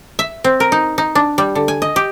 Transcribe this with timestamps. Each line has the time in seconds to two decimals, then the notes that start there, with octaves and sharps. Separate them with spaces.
0.19 E5
0.44 C4
0.60 A#4
0.72 D#4
0.98 D#4
1.15 D4
1.38 G3
1.55 D3
1.68 G#5
1.82 D#5
1.96 G4